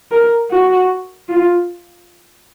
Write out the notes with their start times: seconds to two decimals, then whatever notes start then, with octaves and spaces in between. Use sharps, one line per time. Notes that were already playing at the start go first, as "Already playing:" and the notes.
0.11 A#4
0.50 F#4
1.29 F4